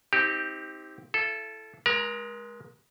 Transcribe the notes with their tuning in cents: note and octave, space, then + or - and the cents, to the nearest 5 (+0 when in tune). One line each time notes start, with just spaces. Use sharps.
C4 +0 D#4 +30 G4 +0
E4 +40 A4 -10
G#3 +10 A#4 +40 A#5 -10